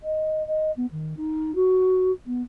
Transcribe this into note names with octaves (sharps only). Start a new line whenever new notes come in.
D#5
D#5
B3
D#3
D#4
F#4
B3